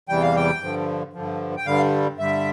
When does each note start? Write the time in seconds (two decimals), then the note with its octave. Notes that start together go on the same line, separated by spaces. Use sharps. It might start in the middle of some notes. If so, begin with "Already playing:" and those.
0.09 E2 C3 E3 G3 G5
0.22 F5
0.36 G5
0.61 G2 D3 F3
1.13 G2 D3 F3
1.57 G5
1.66 G2 D3 G3 F5
2.18 G2 D3 G3 E5